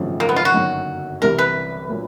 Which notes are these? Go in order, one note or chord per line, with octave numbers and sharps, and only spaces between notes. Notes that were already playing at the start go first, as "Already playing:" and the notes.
Already playing: G#1 F#2 C#3 F3 A3
A#3
B3
F4
F#4
G1 F#2 D#3 F#3 A#3
C2 C3 E3 G3 A#4
B4
A#2 F#3 A#3